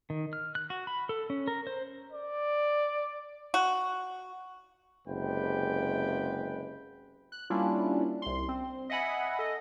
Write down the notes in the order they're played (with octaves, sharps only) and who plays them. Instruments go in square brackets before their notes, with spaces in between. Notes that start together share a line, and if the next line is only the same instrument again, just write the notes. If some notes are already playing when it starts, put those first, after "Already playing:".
[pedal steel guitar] D#3
F6
F#6
F#4
B5
A4
C#4
A#4
C5
[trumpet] D5
[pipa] F#4
[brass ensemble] F#1 C3 G#3 B4 G5
[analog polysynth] F#6
G3 A#3 C#4 D4 E4 F4
C2 C6
C4
D#5 E5 F#5 G#5 B5
A4 D#5